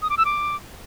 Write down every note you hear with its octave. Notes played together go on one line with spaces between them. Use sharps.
D#6
D6
E6
D6